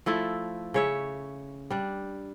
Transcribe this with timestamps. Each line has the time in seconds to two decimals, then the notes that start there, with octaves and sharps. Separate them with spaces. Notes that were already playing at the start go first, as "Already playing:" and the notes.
0.06 F3 A3 E4
0.74 C#3 C#5 E5
1.70 G3 D4